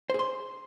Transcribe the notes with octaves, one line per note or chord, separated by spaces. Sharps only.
G#4 C5 C6